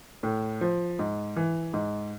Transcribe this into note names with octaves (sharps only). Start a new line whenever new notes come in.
A2
F3
G#2
E3
G#2